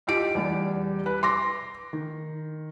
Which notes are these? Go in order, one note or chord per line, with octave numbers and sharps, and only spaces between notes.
D#4 F4 G4 D7
E2 G3
B4
C6 D6 A#6
D#3